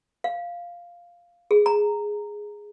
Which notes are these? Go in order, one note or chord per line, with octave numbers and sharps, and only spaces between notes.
F5
G#4
A#5